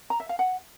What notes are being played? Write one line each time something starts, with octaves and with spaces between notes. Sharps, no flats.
A#5
E5
F5
F#5